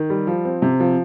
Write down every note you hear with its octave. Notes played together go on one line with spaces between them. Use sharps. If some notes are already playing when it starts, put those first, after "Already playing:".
Already playing: D#3
G3
F3
C4
C3
F3